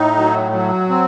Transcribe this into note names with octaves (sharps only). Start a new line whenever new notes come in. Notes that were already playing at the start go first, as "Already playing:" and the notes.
Already playing: A2 D#4
F#3
F#3
C4